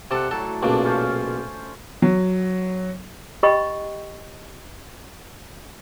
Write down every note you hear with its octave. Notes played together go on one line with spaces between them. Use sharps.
C3 A4 D5 F#5
A2 F#3 A4
B1 A#2 C#3 D4
C#4 F4 C5
F#3
G4 D#5 G5 B5 C#6